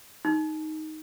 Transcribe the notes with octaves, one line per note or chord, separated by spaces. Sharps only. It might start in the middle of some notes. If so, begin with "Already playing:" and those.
D#4